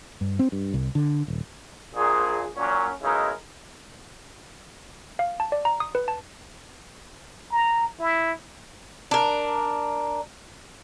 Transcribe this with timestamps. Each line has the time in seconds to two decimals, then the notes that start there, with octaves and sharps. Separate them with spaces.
0.21 G2
0.39 C4
0.52 G2
0.74 C2
0.95 D3
1.28 D#1
1.95 A#1 A#2 G#4
2.56 A#2 F#3 C#4
3.02 B1 C#3 G#3 D#4 E4 A#4
5.19 F5
5.40 A5
5.52 D5
5.65 A#5
5.80 D#6
5.95 B4
6.08 A5
7.51 A#5
8.00 E4
9.11 D4 A#4